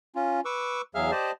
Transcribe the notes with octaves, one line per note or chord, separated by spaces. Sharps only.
C#4 F4
B4 C#6 D6 E6
E2 F#3 G#4 E5 F5 F6
G4 C5 D5 D#5 A5